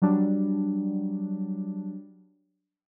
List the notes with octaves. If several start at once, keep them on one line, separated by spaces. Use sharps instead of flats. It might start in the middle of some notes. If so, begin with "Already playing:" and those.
F#3 G3 D4